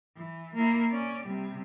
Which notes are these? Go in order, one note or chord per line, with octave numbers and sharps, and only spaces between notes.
E3
A#3 E4
C#4 D5
C3 G3